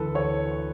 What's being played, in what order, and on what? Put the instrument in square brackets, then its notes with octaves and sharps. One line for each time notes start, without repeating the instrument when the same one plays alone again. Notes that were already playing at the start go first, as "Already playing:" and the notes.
Already playing: [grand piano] D2 E3 A4 B4
C#5